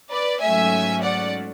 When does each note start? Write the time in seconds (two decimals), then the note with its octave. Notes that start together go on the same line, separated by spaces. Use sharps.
0.11 B4 D5
0.40 G#2 F#3 A3 C#4 E5 G#5
1.02 D5 F#5